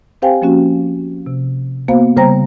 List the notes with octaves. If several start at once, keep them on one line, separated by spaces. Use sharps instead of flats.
C4 G4 C5 F5 G5 G#5
F3 A#3 C#4 F#4
C3
A#3 B3 F#4 C5 F5
C#3 G3 C5 G5 A#5 A#6